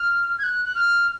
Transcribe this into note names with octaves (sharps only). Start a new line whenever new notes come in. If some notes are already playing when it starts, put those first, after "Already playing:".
Already playing: F6
G#6
F#6
F#6
F6